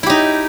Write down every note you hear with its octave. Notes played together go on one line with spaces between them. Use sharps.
D#4 E4 G4